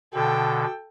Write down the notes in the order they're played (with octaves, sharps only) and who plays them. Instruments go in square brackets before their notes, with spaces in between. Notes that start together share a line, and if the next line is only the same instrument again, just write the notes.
[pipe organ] B2 D3 [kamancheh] A4 G5